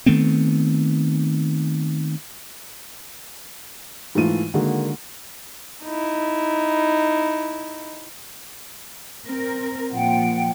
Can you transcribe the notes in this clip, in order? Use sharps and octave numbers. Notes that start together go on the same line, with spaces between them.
D#3 A3 B3 C4
G#2 E3 A3 F4 D#7
D3 D#3 G#3 A#3 F#4
D#4 E4
C4 A#4
A#2 F3 F#5 G5